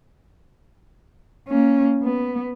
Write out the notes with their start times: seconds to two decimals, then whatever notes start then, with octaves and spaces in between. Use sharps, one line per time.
1.48 A#3 C#4
2.03 B3